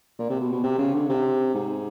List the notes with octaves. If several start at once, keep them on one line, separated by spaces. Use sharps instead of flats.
A#2
C3
B2
B2
C3
C#3
D3
C3
G#2